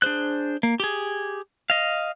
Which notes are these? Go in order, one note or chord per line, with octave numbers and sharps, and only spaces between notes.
D4 G#4 C5 F#6
A#3
G4 G#4
D#5 F5